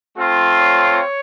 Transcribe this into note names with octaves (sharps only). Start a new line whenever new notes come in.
A3 C4 F4
C#5